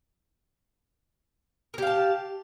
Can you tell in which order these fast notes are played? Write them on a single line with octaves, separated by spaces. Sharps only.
A#4 G4 F5 A5